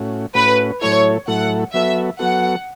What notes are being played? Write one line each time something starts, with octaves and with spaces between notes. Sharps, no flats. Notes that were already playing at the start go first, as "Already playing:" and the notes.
Already playing: A2 A3 C#4 F#4
A2 A3 C#4 F#4 B4
A2 F#3 A3 E4 A4 C#5
A2 F#3 A3 E4 A4 F#5
F#3 B3 F#4 A4 E5
F#3 B3 F#4 A4 F#5